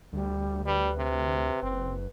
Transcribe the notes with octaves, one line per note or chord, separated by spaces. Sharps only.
D2 G3
G3 B4
C3
F#1 C4